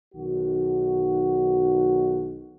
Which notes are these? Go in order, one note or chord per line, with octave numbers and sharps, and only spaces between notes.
B1 D#3 F#4